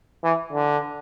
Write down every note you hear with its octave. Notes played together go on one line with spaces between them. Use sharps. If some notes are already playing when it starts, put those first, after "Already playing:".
E3
D3